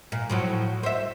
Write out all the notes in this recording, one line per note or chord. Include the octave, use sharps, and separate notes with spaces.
A#2
A2 F3 F#3
C5 E5